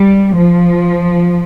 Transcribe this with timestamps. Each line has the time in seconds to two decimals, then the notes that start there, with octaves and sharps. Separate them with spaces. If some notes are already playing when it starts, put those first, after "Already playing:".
Already playing: G3
0.36 F3